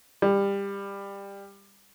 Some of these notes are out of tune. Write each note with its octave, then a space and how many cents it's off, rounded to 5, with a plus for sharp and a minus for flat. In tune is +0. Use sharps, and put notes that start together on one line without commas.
G3 +20